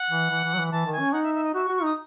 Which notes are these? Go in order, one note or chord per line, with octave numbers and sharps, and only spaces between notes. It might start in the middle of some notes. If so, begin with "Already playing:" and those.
Already playing: F#5
E3
E3
E3
F#3
E3
E3 A5
D#3
G#5
C#4
D#4 F#5
E5
E5
D#5
F#4 E5
C#6
F#4
C#6
D#4 D#6